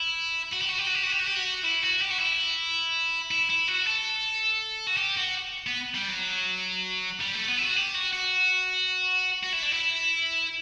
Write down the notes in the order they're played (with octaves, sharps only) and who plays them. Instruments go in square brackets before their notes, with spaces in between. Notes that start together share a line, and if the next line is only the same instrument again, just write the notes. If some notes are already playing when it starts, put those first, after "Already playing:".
Already playing: [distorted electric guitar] E4
F#4
G4
F#4
G4
F#4
G4
F#4
G4
F#4
G4
F#4
E4
F#4
G4
F#4
E4
E4
E4
F#4
A4
F#4
G4
F#4
B3
G3
F#3
G3
A3
B3
E4
F#4
G4
F#4
F#4
F#4
E4
D4
E4